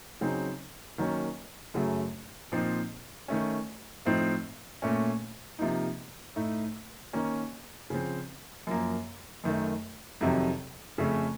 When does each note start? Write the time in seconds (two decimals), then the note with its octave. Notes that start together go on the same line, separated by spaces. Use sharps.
0.21 C#3 F#3 C4 D#4
0.98 D#3 F#3 A#3 C#4
1.74 F#2 C#3 F#3 A3
2.52 A#2 F3 C4 D#4
3.28 D#3 A3 C#4
4.06 A2 F3 C4 D#4
4.82 A#2 A3 C#4
5.59 C3 F3 A#3 D#4
6.36 A2 A3 D#4
7.13 D#3 A#3 C#4
7.90 C#3 F3 C4
8.67 F#2 F3 A#3
9.44 F#2 D#3 A3
10.21 F2 C3 D#3 F#3
10.98 F2 C#3 A3 C#4